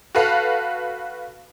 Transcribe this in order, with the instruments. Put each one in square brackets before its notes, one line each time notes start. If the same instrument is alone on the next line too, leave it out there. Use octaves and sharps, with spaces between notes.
[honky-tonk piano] F#4 A4 B4 F5